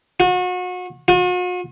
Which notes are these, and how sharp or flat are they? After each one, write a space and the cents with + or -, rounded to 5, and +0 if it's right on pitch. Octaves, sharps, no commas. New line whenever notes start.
F#4 -35
F#4 -45